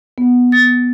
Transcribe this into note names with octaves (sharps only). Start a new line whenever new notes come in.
B3
A6